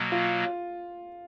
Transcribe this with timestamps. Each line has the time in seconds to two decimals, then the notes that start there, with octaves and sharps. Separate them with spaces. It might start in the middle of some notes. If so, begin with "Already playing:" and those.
Already playing: B2 F#3 A#3
0.12 F4